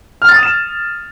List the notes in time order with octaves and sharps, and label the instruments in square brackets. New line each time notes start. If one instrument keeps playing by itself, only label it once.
[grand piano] F6
A6
D#6
E7